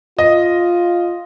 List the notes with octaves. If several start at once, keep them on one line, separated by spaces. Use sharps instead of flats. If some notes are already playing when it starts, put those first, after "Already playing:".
F4 D#5